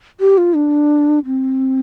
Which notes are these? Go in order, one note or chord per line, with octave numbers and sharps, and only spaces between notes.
G4
F4
D4
C4